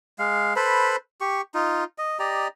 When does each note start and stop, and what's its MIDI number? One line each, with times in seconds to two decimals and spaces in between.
0.19 0.54 56
0.19 0.54 77
0.56 0.96 69
0.56 0.96 71
0.56 0.96 72
0.56 0.96 83
1.21 1.41 67
1.21 1.41 85
1.54 1.84 63
1.54 1.84 65
1.98 2.19 75
2.19 2.48 67
2.19 2.48 74
2.19 2.48 75
2.19 2.48 82